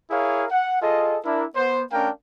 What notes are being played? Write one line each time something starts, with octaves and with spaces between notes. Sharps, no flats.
E4 G#4 A#4 C#5 F5
F#5
F4 G#4 A4 D#5
D4 E4 A#4
B3 C5
A3 C#4 D4 A#4 F5 G5